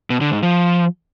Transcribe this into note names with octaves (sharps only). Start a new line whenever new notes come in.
B2
D3
G#2
F3